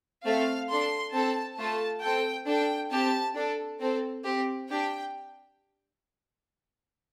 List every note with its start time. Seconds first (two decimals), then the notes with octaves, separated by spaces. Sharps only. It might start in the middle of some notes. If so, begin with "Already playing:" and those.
0.24 A3 C4 A4 F5
0.69 D4 A4 C6
1.13 C4 A4 A5
1.58 A3 F4 A4 A5
2.02 C4 A4 G5
2.46 D4 A4 G5
2.91 C4 G4 A5
3.35 D4 A4
3.80 C4 A4
4.24 C4 G4
4.68 D4 G4 G5